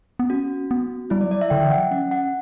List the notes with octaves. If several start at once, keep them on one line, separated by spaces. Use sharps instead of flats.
B3
C#4 F#4
B3
G3 E4
D5
F#3
D5
E5
D3 G5
E3
F#5
F#3
C#4 F#5
F#5